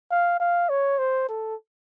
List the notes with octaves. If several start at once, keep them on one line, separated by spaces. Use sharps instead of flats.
F5
F5
C#5
C5
A4